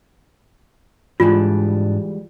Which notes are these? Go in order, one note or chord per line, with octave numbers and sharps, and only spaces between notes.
G#2 E3 G3 G#3 D4 F4 A5